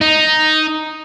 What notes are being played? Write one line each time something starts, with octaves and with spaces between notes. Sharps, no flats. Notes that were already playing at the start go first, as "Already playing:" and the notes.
D#4